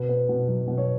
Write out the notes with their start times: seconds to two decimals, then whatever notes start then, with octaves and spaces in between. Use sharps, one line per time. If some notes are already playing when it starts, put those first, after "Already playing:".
Already playing: B2 B4
0.09 B3
0.29 B2
0.48 F#3
0.68 B2
0.78 C#5